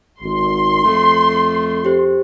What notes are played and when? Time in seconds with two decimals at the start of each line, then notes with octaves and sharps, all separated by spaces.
0.22 G#1 C6
0.84 F2 A3
1.85 G4 C5